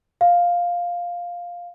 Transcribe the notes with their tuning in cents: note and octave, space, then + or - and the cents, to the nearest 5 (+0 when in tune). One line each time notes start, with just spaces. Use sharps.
F5 +5